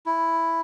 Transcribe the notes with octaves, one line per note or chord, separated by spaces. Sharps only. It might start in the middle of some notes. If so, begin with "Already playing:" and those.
E4